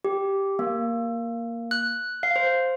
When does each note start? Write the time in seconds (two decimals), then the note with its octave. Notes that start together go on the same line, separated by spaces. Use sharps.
0.05 G4
0.59 A#3
1.71 F#6
2.23 F5
2.36 C5